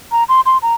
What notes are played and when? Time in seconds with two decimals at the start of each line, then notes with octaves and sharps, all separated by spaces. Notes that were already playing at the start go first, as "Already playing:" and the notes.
0.12 A#5
0.29 C6
0.46 C6
0.62 A#5